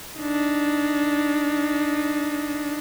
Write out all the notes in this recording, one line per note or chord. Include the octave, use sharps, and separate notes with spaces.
D4 D#4